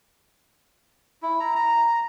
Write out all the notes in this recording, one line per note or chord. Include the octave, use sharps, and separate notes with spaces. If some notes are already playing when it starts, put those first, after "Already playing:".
E4
A#5
A#5